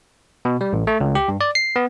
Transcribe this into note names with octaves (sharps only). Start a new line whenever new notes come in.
B2
G3
A1
A3
C#2
G4
G2
D5
C7
B3